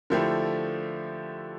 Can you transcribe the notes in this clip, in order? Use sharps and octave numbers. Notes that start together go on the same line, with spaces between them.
D3 F3 A3 E4 G4